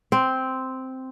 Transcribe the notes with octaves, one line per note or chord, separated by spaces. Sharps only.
C4